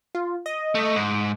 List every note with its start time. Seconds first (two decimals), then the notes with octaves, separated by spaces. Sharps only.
0.15 F4
0.46 D#5
0.75 A3
0.96 G#2